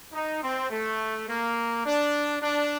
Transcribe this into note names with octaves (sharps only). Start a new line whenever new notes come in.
D#4
C4
A3
A#3
D4
D4